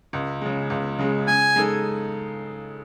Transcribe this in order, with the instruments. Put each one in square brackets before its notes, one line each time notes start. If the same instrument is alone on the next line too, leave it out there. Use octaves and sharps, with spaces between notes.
[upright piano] C#2
C#3 G#3
C#2
C#3 G#3
[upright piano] C#3 [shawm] G#5
[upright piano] G#3 D#4 A4